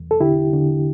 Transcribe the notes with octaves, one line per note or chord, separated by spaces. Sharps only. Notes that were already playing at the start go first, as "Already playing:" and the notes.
Already playing: E2
A4
D3 E4 G4
D3